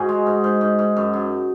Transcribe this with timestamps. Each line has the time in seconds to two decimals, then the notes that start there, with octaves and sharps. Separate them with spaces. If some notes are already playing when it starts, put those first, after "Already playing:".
Already playing: G#2 F#4 G#4
0.09 G#3
0.27 G#2
0.44 G#2
0.61 G#2
0.79 G#2
0.97 F#2
1.14 F#2